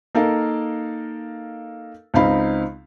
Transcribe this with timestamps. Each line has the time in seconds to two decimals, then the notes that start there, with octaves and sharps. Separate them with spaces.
0.15 A#3 D#4 A4 A#4 F5
2.14 C#2 C4 D#4 F5 B5